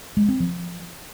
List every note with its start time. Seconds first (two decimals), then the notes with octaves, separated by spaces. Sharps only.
0.17 G#3
0.29 C4
0.40 F3